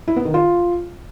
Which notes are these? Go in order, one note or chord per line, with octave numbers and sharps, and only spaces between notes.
E4
B3
D#3
F4